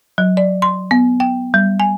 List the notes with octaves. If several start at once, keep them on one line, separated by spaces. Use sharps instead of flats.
F#3
D5
C6
B3
G5
G3
G#5